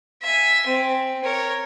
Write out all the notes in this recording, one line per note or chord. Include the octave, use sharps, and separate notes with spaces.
E5 G#5
C4
A#4 C#5